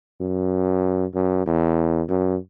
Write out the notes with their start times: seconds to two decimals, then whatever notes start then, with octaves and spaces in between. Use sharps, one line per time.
0.21 F#2
1.15 F#2
1.46 E2
2.09 F#2